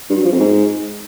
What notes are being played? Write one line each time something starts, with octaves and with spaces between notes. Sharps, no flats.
G2
F#3
F3
F2
G#2